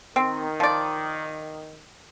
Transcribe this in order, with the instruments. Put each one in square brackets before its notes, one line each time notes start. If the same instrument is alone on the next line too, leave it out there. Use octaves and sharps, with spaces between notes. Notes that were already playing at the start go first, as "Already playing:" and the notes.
[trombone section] D#3 [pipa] C4
[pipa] F3 D5